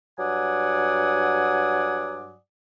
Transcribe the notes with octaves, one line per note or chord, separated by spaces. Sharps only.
G2 F#3 D5 F#5 G#5 D#6